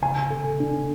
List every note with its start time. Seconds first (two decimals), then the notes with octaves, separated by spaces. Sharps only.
0.02 C#3 G#5
0.31 A4
0.60 D4